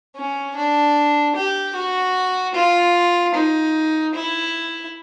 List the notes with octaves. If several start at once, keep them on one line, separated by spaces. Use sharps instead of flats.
C#4
D4
G4
F#4
F4
D#4
E4